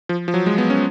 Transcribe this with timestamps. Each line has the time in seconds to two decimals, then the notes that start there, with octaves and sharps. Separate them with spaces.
0.09 F3
0.28 F3
0.34 F#3
0.46 G#3
0.58 B3
0.70 C#4